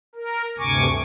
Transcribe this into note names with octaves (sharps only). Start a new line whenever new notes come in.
A#4
D2 G2 C3 G#5 C#6 D6